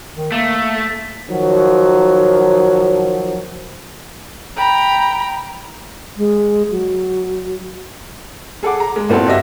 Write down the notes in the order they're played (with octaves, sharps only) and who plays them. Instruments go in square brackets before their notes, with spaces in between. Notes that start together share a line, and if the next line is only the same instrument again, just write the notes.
[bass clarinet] D#3
[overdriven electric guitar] A3 [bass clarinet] A#3
[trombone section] D#3 F3 F#3
[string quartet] G5 A#5 B5
[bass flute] G#3
F#3
[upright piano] G#4 A4 F#5 D6
A#5
G#3
A#2 B3 C4 E4 F#4 A4
G1 F#4 G4 D#5 E5 A#6